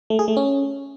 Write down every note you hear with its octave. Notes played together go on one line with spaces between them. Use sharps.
A3
G#4
A3
C#4